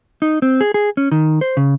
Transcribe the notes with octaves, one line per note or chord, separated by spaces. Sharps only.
D#4
C4
G#4
G#4
C#4
D#3
C5
C#3